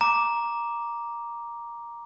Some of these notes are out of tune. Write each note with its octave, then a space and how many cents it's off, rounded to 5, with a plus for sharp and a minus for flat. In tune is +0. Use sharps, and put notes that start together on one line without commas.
A#5 +10 D6 +0